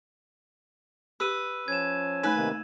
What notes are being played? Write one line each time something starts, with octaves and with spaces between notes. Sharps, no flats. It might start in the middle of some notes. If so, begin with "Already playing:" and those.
G4 B4 E6 D#7
F3 C#4 G#6 E7
A3 D#4 B4 G#5
C3 D#3 A#3